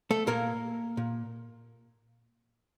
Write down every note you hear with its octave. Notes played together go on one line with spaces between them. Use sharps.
A3 A4
A#2 A#3 A#4
A#2